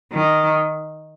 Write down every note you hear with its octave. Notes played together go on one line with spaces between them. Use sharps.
D#3